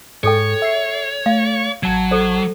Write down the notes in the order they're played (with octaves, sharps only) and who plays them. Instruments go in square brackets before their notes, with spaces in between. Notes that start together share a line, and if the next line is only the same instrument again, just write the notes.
[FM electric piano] G#2 [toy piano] G#4 A4 G5 [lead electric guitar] C#5
[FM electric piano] E5 C7
[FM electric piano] A3 [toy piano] F5
[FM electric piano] A1 A5 G#6 [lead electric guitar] F#3
[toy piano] A4 C5